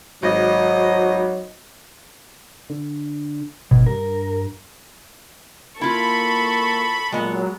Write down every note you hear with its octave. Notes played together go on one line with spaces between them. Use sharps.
G#1 F#3 D#5
D3
G#1 B2
G2 A#4
A#3 E4 F4 A4 B5 C#6
A#2 F#3 G#3 B3